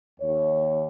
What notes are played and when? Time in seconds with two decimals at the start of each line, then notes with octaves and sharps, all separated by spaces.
0.19 D#2 C#5